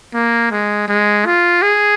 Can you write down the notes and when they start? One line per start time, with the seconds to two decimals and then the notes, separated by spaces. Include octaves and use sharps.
0.14 A#3
0.51 G#3
0.88 G#3
1.26 F4
1.62 G#4